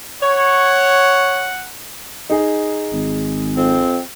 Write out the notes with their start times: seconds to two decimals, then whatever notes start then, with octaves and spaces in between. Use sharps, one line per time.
0.22 C#5 F#5
2.30 D#4 G#4
2.93 G#1
3.55 F2 C4